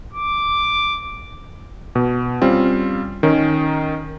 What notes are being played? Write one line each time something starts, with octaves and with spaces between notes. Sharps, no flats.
D6
B2
G3 C4 C#4 F4
D#3 C#4 D#4